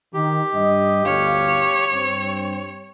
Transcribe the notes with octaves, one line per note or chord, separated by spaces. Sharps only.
D#3 G4
G2 D#5
G1 D2 C#5 F5
G2 C4